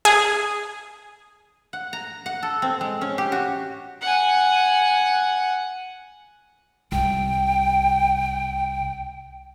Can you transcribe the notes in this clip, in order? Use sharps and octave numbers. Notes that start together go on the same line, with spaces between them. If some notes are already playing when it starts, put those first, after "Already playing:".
G#4
F#5
A#5
F#5
A4
C4
G#3
C#4
G4
F#4
F#5 G#5
C2 G5